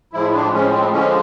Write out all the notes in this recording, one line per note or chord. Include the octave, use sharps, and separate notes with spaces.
A2 F3 G#3 E4
D4
A2 F3 G#3 C#4
C4
D3 F3 G#3 C#4